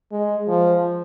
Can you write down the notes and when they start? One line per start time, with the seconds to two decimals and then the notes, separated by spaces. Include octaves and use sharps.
0.12 G#3
0.48 F3